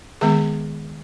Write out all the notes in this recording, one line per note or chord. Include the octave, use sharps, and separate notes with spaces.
D#3 G#3 B3 G#4